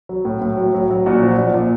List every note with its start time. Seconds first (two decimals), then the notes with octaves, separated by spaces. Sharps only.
0.09 F#3
0.25 A2
0.41 A2
0.57 F#3
0.74 F#3
0.91 F#3
1.06 A#2 F#4
1.22 F3
1.38 A#2
1.54 A#2